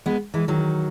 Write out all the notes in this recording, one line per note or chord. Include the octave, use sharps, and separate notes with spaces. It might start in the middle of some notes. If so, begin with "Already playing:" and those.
G#3 B3
E3 G#3
D#3 F#3